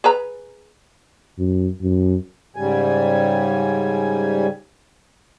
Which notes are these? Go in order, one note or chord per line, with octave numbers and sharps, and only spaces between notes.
G#4 B4 A#5
F#2
F#2
G#2 C#3 G3 G#5